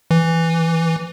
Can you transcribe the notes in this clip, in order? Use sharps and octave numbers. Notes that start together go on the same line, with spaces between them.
E3